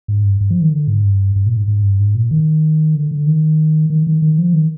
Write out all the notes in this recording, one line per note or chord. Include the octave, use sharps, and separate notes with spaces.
G#2
G2
G2
F3
D#3
D3
G#2
G2
G2
A#2
G#2
G#2
G2
G#2
A#2
D#3
D3
D3
D#3
D#3
D#3
D#3
F3
D#3